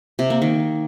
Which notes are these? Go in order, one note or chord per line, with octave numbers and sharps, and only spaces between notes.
C3
A#3
D#3